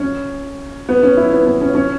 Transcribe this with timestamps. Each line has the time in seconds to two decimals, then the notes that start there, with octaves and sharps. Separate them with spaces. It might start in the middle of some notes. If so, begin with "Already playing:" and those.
Already playing: C#4
0.89 B3
1.03 C#4
1.17 E4
1.32 B3
1.47 B3
1.61 C#4
1.75 C#4